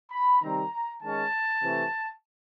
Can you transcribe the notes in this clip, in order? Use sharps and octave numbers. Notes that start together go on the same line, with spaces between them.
B5
C3 D#3 G3 C4 A#5
D#3 G#3 C#4 A5
C3 E3 A3